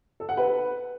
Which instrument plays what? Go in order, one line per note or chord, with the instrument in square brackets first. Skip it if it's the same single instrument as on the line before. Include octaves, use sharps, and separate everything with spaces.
[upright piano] A4
F#5
B4